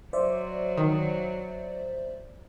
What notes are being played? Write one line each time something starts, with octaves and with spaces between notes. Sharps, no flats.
F#3 C5 D5 E5
D#3